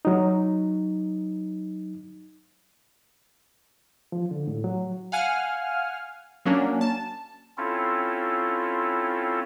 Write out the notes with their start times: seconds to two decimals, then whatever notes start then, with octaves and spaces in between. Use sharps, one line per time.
0.05 F#3 D#4
4.12 F3
4.31 D3
4.47 A2
4.64 F#3
5.12 F5 F#5 G#5 F6
6.45 F#3 A#3 C#4 D4
6.81 A5
7.57 C4 C#4 E4 F4 A4